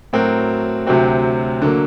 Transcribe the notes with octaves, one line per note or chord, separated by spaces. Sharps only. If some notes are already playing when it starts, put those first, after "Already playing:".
A2 F#3 C4 F#4 A#4
D2 C3 F#3 C4 F#4
D3 F#3 A#3